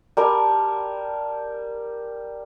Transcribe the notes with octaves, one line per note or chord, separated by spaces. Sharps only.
G3 A#4 G#5 A5